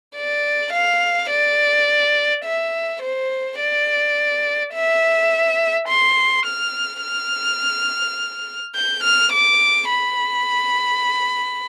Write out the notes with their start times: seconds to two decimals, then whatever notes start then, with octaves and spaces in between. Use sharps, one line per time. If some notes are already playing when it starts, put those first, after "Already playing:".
0.16 D5
0.73 F5
1.30 D5
2.45 E5
3.02 C5
3.59 D5
4.74 E5
5.88 C6
6.46 F6
7.03 F6
8.75 G6
9.04 F6
9.32 D6
9.89 B5